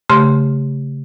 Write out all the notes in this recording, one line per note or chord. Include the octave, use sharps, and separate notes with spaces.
C#3 A3 G4 C6